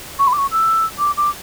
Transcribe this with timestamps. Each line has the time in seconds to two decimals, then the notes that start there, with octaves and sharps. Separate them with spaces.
0.19 C#6
0.27 B5
0.33 D6
0.38 C#6
0.52 E6
0.99 D6
1.17 D6